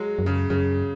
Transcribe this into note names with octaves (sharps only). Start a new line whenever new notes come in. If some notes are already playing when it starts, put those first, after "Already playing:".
Already playing: F#3 G#3
F#2
C#3
F#2 C#3